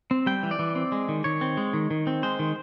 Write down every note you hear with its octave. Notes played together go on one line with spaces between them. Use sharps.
C4
G3 G5
E3
D5
E3
C4
G#3
D#3
D#3 C#5
C4
G#3
D#3
D#3
C4
G#3 C5
D#3